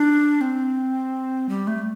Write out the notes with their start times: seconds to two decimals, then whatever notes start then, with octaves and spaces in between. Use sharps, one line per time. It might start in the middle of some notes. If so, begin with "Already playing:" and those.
Already playing: D4
0.41 C4
1.49 G3
1.67 A3